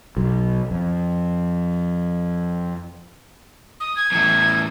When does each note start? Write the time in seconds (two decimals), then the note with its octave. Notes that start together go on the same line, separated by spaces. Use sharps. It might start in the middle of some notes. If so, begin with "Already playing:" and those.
0.17 B1
0.71 F2
3.80 D#6
3.96 G#6
4.12 E2 A2